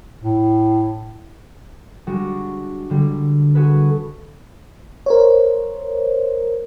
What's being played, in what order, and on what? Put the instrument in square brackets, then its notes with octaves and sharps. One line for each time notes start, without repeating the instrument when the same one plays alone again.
[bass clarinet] A2
[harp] G3 G#3 D4 F#4
D3 G3
F#4 G#4 A4 B4
[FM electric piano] A#4 C5 C#5